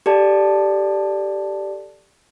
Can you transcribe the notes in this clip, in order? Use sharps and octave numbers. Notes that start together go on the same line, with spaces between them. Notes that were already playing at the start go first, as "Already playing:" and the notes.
G4 A4 D5 A5